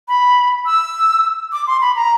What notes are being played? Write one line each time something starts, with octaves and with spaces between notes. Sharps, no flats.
B5
E6
D6
C6
B5
A#5